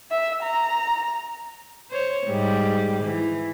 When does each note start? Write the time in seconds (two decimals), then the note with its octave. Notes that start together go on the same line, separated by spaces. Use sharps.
0.11 E5
0.43 A#5
1.91 C5 C#5
2.28 G#2 G3
3.04 E3